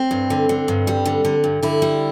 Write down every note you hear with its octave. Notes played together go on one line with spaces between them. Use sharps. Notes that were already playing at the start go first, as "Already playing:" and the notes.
Already playing: C4
G2
D3
D3
G2
G3
D3
D3
G2
D3 E4
G3